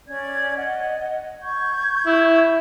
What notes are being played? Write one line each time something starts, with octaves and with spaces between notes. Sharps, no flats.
C#4 D5 G#6
D#5 F#5
C#6 G6 G#6
E4